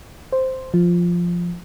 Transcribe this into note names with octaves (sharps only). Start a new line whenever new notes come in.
C5
F3